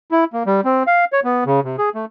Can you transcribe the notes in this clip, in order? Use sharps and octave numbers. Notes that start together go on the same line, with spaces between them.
E4
A#3
G3
C4
F5
C#5
B3
C#3
C3
G#4
A3